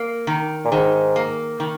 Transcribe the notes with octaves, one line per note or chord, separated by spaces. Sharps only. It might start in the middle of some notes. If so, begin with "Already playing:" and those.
Already playing: A#3
D#3
A#2
G#2 D#3
A#3
D#3